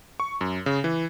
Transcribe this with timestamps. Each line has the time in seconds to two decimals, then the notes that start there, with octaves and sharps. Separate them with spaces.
0.20 C#6
0.41 F#2
0.66 C#3
0.84 E3